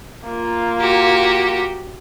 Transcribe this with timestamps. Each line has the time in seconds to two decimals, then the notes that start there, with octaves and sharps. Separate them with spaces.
0.24 A#3 F4
0.80 F#4 G4